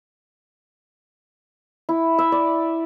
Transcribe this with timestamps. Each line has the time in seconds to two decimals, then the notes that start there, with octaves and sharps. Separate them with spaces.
1.89 E4
2.19 E5
2.32 D5